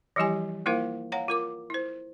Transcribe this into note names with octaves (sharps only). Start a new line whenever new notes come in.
E3 F3 G3 E4 G4 G#5
A#3 E4 F4 A#4 C5 F5
C#5 F5 F#5 A#5
F4 A#4 D6
E4 C5